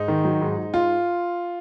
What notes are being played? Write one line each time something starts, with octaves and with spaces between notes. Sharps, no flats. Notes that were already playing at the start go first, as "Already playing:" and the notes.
Already playing: G#2 D#4
D#3
F#3
G#2
G#2
F4